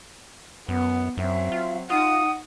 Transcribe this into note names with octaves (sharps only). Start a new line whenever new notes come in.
F#2 B3
F#2 F#3 C4 E5
F4
D#4 F4 F#5 D#6